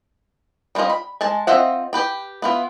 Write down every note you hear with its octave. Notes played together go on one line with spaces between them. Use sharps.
G3 G#3 C4 F4 D#5
B5
G#3 G#5 A5
C4 F4 D#5 E5 F#5
G4 B4 G5
B3 E4 F4